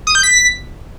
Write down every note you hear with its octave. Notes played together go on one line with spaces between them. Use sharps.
D#6
G6
B6